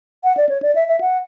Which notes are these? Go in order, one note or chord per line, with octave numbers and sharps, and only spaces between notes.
F#5
D5
C#5
D5
E5
E5
F#5